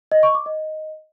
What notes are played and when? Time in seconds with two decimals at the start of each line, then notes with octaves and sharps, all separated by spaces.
0.12 D#5
0.23 C#6
0.34 D6
0.46 D#5